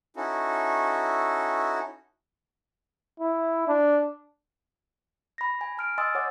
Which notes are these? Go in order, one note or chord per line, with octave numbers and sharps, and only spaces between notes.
C#4 D#4 E4 F#4 A4
E4
D4
B5 A#6
G#5
A5 F6 D7
D#5 G#5 C6 D#6 E6 A6
C#5 F#5 D6 A6